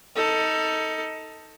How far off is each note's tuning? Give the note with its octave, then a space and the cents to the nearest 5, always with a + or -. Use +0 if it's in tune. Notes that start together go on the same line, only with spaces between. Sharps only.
D#4 +20 A4 +20